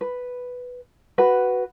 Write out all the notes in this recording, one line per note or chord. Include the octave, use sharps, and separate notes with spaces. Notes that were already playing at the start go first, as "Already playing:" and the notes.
B4
F#4 B4